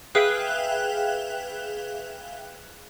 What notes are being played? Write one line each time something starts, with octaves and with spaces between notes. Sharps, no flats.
G#4 B4 E5 F5 G5 F#6